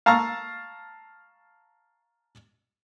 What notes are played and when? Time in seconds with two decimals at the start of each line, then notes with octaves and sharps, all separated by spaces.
0.06 F5 A5 A#5 C#6 E6 F6